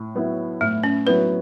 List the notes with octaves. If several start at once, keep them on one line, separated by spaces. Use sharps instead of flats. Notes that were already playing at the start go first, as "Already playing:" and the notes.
Already playing: A2
F#3 B3 E4
A2 A3
C#4
F#3 B3 E4 B4